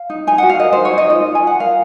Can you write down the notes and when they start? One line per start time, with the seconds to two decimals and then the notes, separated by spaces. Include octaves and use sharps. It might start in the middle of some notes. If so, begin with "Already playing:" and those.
Already playing: F5
0.10 D#4
0.27 D#4 G#5
0.38 F#4 F#5
0.49 F5
0.59 A#4 D#5
0.73 D#4 C5
0.85 C#5
0.93 D#4 D#5
1.09 F4 D#5
1.26 F4
1.35 G#5
1.43 F4 F#5
1.60 A#4 F5